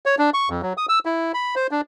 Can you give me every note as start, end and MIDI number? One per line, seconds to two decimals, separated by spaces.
0.06 0.15 73
0.19 0.30 62
0.34 0.49 85
0.50 0.61 41
0.63 0.73 54
0.77 0.86 87
0.89 0.99 88
1.06 1.32 64
1.34 1.55 83
1.56 1.67 72
1.71 1.81 62